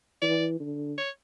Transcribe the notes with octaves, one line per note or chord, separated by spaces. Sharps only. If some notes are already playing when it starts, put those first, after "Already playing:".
E3 D5
D3
C#5